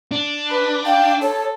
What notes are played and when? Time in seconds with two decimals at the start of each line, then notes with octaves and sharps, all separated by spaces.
0.12 D4
0.51 B4
0.86 F5 G5
1.22 A4 C#5